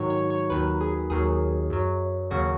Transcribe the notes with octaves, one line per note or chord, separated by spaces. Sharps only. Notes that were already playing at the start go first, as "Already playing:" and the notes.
Already playing: G#2 D#3 F#3 C#5
C#5
C#5
D#2 D#3 F#3 B4
G#4
D#2 D#3 F#3 G#4
F#2 F#3
D#2 C#3 F#3 F#4